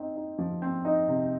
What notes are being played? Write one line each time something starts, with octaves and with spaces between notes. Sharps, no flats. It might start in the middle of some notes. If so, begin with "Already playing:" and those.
Already playing: C4 D#4
D#4
F3
C4
D#4
C3